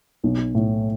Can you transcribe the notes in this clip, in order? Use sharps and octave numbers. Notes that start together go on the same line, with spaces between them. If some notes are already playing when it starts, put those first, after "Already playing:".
B1
A2